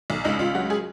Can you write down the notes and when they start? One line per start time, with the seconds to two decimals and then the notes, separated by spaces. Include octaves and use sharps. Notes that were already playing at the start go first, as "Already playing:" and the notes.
0.10 B1
0.24 C#2 D#4
0.39 C#2 F4
0.55 F#3 F#4
0.70 G#4